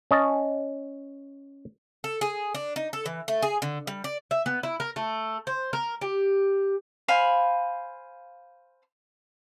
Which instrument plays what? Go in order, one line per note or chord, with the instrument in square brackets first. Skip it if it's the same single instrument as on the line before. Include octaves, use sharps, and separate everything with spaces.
[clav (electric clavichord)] C#4 D#5 A5
[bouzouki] A4
G#4
D4
D#4
A4
E3
A3
G#4
D3
G3
D5
E5
B3
E4
A#4
A3
C5
A#4
G4
[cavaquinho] C5 F5 G#5 B5